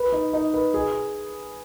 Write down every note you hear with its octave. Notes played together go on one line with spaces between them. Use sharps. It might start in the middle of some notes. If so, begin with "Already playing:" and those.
Already playing: B4
D#4
D#4
B4
G#4